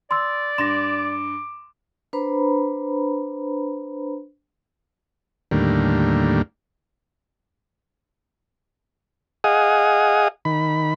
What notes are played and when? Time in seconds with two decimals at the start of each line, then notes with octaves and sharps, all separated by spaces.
0.11 D5 C6 E6
0.58 G2 C6 D6 A#6 E7
2.13 D4 B4 C5 A#5 B5
5.51 D#2 A2 D3 G3 A#3
9.44 G#4 D#5 F5 F#5 G#5 D#6
10.45 D#3 B5